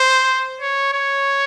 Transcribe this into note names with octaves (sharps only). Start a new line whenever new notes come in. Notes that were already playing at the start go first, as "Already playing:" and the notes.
Already playing: C5
C#5
C#5